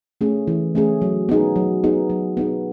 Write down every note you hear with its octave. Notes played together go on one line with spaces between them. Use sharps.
A3 C#4 G#4
E3
A3 C#4 G#4
F#3
B3 D#4 G#4
F#3
B3 D#4 G#4
F#3
B3 D#4 G#4